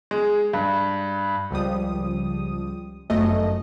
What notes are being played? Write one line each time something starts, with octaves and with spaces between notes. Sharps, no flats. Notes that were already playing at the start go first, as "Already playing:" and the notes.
G#3
G2
C#2 F3 G3 D#6
G1 F#2 A3 D#5